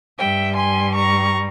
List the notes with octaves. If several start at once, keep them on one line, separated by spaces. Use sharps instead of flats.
G2 G3 E5 G5
G#5 C6
A#5 C#6